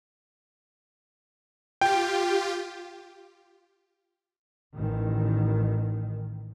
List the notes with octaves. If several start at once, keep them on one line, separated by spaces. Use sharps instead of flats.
F4 G4 G5
A1 D#3